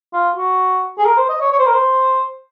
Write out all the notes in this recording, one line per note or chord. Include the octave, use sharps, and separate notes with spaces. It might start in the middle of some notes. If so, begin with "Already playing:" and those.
F4
F#4
G#4
A#4
C5
D#5
C#5
C#5
C5
A#4
C5